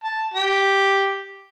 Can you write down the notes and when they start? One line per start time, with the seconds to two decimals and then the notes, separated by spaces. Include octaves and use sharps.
0.04 A5
0.34 G4